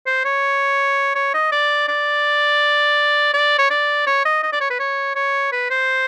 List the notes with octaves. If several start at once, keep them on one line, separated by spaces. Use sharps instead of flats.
C5
C#5
C#5
D#5
D5
D5
D5
C#5
D5
C#5
D#5
D#5
D5
C#5
B4
C#5
C#5
B4
C5